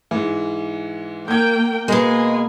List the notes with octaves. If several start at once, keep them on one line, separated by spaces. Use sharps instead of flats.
G#2 E3
A#3 G5 G6 G#6
B2 G#3 A#3 G#5